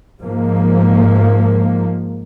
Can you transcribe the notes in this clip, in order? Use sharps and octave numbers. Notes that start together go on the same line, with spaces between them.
G#2 F3 A#3